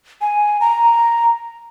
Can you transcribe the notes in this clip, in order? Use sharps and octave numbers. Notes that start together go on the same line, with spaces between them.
G#5
A#5